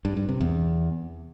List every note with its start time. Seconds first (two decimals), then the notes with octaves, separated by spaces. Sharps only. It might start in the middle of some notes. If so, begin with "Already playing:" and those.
0.05 G2
0.17 G2
0.29 C3
0.41 E2